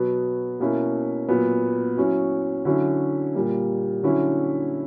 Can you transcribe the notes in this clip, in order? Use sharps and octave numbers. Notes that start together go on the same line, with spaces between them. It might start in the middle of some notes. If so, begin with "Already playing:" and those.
Already playing: B2 F#3 B3
B2 A#3 C#4 E4
A#2 F#3 B3
F#3 C#4 E4
D3 F#3 C#4 E4
A#2 G3 A#3
D3 F#3 C#4 E4